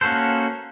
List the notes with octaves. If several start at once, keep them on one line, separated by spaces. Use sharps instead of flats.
A#3 C#4 F#4 A4 C5